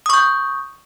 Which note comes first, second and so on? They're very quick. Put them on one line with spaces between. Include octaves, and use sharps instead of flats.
D#6 C#6 G6